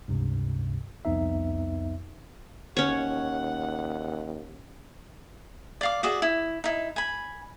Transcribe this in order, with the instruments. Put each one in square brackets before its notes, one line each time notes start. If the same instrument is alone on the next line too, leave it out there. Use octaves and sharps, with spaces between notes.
[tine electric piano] C#2 G2 C3
C2 F2 B3 D#4 E5
[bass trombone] D#2 [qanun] C#4 C#5 [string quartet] F#5
[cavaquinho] D5 F5 D6
F#4 G#4 D5 E5
E4
D#4 E4
G#5 B5